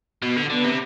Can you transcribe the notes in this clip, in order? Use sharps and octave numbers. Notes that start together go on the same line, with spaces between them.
B2 B3
D3
D3 B3
C3